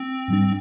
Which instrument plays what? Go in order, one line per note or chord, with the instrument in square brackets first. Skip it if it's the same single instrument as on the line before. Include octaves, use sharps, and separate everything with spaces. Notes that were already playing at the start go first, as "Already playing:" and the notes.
Already playing: [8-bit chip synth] C4
[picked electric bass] G#2 G3 D4